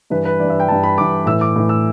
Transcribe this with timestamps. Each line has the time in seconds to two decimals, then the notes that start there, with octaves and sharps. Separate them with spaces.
0.10 G2 E3 B4
0.25 B4
0.40 G2 E3 D5
0.50 E5
0.60 G5
0.68 G2 E3 A5
0.84 B5
0.98 G2 E3 D6
1.26 A2 E3 E6
1.41 D6
1.56 A2 E3
1.69 E6